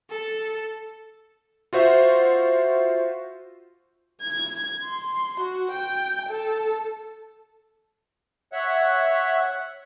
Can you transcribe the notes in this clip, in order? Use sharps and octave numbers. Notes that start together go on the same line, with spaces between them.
A4
F4 F#4 C5 E5
G#6
C6
F#4
G5
A4
C#5 E5 F#5